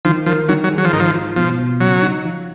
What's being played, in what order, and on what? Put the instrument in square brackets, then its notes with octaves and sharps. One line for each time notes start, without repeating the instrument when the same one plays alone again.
[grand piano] D#3 [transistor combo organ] F3
[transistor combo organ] F3 [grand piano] A#4
[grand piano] D#3 [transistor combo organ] F#3
[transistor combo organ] F#3
[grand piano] G#4
[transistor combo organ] F#3
F3
[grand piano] G#2 [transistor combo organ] D#3
[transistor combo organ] F3
[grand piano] F4
[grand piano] B2 [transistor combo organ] F3
[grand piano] B2
[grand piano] C#3 [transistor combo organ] F#3
[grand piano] D#4
F3